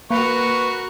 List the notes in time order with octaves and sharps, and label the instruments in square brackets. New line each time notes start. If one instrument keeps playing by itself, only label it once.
[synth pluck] A#3 [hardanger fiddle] F#4 A#4 [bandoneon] B4 [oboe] C#6